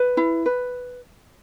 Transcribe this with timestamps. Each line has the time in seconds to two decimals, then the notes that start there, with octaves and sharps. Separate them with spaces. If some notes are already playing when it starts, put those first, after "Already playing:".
Already playing: B4
0.17 E4
0.46 B4